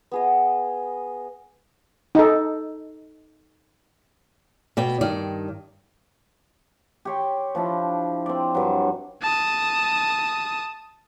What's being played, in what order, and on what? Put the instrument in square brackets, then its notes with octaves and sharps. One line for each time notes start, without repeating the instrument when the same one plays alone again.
[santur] B3 G#4 D#5
[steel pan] D#4 A4
[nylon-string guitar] B2 D5 G5
G2 D#3 D5
[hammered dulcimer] G4 C#5 C6
F3 D4 E4
C4 D5
G2 F#3
[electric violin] A5 D#6